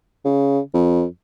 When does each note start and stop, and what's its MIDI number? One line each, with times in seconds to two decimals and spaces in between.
0.25 0.59 49
0.74 1.04 41